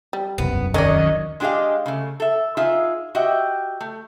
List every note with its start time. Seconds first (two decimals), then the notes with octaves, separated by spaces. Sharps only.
0.13 G3
0.38 E1 C2 F#2 B3
0.74 D#3 F#3 C#4 A#4 C5 D5 D#5
1.40 G#3 D4 G4 G#4 D#5 F5
1.86 C#3 A3
2.20 A4 E5
2.57 D#4 F4 G#4 E5
3.15 F#4 G4 D#5 E5 F#5 G5
3.81 A3